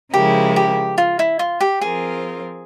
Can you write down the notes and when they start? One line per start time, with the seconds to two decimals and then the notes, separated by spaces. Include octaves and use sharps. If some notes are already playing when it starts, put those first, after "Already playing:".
0.13 C#3 F3 G#3 E4 G4 A#4
0.56 G4
0.98 F4
1.19 E4
1.39 F4
1.60 G4
1.81 F3 C4 F4 G#4 A#4